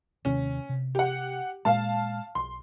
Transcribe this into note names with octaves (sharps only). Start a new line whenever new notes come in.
D#2 C3 D#3 C#4
C3
G4 F#5
A#2 G#3 F5 A5
B1 C6